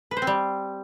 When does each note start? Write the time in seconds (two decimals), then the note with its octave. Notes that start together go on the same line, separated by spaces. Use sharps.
0.11 B4
0.17 C5
0.22 C4
0.27 G3